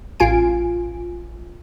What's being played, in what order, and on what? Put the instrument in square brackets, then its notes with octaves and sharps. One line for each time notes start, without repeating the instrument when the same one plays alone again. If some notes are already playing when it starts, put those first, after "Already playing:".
[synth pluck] A1 F4 G#5 D7